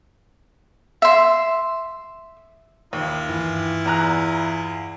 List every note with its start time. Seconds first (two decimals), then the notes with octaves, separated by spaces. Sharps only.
1.02 E5 C6
2.93 D#2 E4 F4
3.29 G2 E3
3.85 E2 A#5 F#6